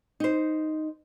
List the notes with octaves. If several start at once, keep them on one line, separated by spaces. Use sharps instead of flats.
D#4 C5